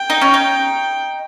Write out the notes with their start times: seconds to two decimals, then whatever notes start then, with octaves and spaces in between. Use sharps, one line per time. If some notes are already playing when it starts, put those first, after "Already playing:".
Already playing: G5
0.10 D#4
0.21 C#4
0.34 D#4